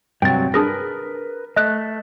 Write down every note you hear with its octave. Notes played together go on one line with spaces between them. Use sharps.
G2 C3 F#3 G5 A6
D4 G#4 A#4 B4 A#6
A3 D#5 F#6